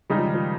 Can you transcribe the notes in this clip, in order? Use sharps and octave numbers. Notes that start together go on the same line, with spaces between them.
C#3 G3 G#3 D#4
F3
D#3
F3